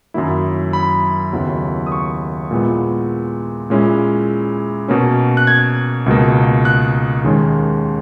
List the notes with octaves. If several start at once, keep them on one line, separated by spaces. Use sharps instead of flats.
F#2 D#3 F#3 A#3 E4
B5
D#2 C#3 F#3 B3 E4
D#6
C#6
A#2 G#3 B3 E4
A#2 G#3 C#4 E4
B2 A#3 C#4
F#6
G#6
C#2 B2 A#3
F#6
D#2 D#3 G#3 C#4